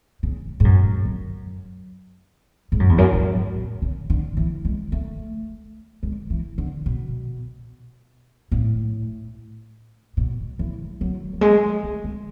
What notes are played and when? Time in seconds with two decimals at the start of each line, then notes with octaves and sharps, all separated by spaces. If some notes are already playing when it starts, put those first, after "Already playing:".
0.23 C#3
0.60 G#2
0.65 F#2
1.05 F#2
2.72 G#2
2.80 F#2
2.89 E2
2.98 F#2
3.13 G#2
3.55 A2
3.82 C#3
4.10 D3
4.37 E3
4.65 G#3
4.92 A3
6.03 G#3
6.30 E3
6.58 D3
6.86 B2
8.52 A2
10.17 B2
10.59 E3
11.01 F#3
11.33 F#3
11.41 G#3
11.83 A3
12.04 G#3